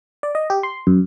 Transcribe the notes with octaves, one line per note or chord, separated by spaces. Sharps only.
D5
D#5
G4
C6
F#2